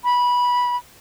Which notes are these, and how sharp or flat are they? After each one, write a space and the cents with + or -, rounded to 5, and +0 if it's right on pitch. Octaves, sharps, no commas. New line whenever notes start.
B5 -15